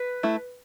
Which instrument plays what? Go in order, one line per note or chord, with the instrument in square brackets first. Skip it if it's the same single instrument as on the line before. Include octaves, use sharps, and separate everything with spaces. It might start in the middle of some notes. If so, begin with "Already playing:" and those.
Already playing: [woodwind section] B4
[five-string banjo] A3 E4